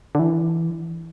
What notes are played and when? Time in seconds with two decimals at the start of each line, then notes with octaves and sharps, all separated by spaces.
0.15 D3
0.19 E3